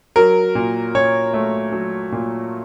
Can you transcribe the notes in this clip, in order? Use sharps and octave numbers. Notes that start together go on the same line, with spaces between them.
F#3 A#4
A#2
A#2 C#5
A3
F#3
A#2